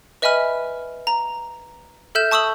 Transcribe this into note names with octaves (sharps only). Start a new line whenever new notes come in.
B4 D#5 E5 G#5 B5 F6
A#5
A4 E5 F6 G6 E7
A5 C#6 D#6 E6 F#7 G7